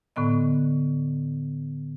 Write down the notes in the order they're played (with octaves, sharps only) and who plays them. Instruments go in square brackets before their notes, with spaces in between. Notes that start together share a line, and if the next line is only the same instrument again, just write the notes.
[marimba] A2 D3 B3 D#5